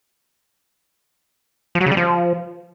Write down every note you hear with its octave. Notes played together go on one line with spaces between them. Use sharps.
F3
F#3
C#3
G3
F3